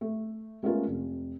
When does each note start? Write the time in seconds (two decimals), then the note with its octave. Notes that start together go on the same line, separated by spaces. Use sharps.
0.01 A3
0.63 G#3 A3 B3 C#4 F4 A#4
0.87 F1